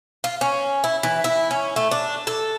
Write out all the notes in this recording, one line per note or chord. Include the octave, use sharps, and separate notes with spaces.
F4
C#4
E4
E3
E4
C#4
A3
D4
A4